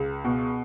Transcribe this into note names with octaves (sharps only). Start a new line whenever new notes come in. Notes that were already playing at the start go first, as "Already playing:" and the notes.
Already playing: C#2
B2